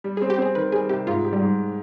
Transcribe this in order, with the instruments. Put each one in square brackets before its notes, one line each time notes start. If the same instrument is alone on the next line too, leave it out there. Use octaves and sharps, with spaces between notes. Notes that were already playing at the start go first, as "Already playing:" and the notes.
[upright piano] G3
[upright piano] C4 [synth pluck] G#4
[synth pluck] G4
[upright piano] C4 [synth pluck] G#4
[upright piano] D#3 [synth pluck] B4
[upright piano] G3 [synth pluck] G#4
[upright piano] C3 [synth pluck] G4
[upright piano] G#2 [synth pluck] F4
[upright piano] G4
[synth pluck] G3
[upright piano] G#2